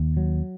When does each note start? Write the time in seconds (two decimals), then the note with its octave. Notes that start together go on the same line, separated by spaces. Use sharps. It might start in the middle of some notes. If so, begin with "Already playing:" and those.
Already playing: D#2
0.17 F#3